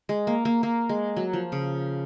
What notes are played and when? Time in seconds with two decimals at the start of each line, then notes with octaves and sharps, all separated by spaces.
0.09 G#3
0.27 A#3
0.45 A#3
0.63 A#3
0.89 G#3
1.17 F#3
1.33 F3
1.52 C#3